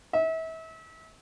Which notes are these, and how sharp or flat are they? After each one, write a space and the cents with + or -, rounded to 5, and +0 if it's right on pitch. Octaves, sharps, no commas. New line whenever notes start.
E5 -35